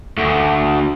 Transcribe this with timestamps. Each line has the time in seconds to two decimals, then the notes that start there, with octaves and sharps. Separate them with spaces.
0.18 D2 D3